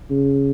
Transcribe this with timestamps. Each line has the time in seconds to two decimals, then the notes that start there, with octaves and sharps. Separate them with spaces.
0.10 C#3